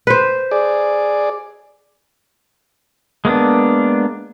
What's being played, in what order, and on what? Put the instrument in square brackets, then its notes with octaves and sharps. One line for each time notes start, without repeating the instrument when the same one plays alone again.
[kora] B4 C5
[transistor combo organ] G#4 D5
[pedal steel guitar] G#3 A#3 B3 D4